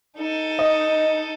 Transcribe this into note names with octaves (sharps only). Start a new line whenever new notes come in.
D#4 A4
D#5